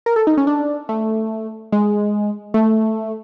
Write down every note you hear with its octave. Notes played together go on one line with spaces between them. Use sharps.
A#4
A4
D#4
C#4
D4
A3
G#3
A3